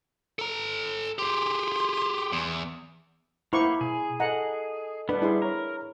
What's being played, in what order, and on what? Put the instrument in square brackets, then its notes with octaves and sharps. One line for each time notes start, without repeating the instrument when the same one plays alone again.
[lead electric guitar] A4 A#5
[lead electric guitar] G4 G#4 [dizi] C6
[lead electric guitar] E2
[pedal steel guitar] A#3 [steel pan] E4 C5 C#6 [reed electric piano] F#5 B5 D6
[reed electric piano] B2 [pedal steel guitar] G#4
[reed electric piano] A4 D#5 [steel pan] F#5 A#5
[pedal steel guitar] G3 B3 [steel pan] D4 B4
[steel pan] E4 G#4 C6
[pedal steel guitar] A#4 [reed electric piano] C#5 A#5